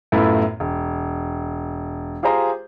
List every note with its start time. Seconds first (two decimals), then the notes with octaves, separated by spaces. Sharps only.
0.12 F#2 A2 A3 B3 E4 F4
0.60 E1
2.23 F4 G4 G#4 C5 A#5